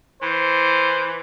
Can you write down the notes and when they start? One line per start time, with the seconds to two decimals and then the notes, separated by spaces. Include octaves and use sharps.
0.22 E3 C5